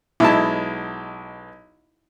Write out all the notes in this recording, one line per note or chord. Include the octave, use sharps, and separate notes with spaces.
B1 G#3 E4 A5